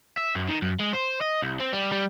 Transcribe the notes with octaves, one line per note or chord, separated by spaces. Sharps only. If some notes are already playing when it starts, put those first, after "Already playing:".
E5
F#2
D#3
F#2
G#3
C5
D#5
C2
C4
G3
G3